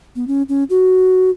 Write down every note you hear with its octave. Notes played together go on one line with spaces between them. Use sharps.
B3
C#4
C#4
F#4